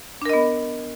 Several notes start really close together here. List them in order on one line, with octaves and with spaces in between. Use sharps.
D4 A#4 D#5 B3